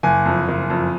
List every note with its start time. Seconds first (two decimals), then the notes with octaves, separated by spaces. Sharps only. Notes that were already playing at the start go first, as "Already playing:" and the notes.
0.03 F#1 G#5
0.26 F2
0.48 F#1
0.70 F2